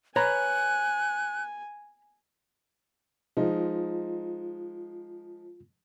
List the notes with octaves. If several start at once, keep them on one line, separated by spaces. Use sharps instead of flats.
B4 C#5 G#5 A#5 F#6
F3 G#3 D#4 F4